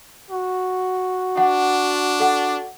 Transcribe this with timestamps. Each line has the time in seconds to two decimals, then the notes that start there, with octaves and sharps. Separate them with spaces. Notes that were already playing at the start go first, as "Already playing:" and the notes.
0.31 F#4
1.38 D4 F#5
2.20 A4 F#5